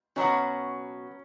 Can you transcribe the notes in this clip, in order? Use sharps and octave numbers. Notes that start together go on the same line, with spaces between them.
B2 F#3 B3 C#4 F#4